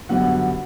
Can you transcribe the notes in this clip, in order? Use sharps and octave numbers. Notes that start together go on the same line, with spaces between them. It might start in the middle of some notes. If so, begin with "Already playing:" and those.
F#2 D3 G3 B3 F#5